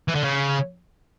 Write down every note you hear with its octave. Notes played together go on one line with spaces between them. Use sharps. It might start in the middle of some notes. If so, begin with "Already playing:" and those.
E3
D3
C#3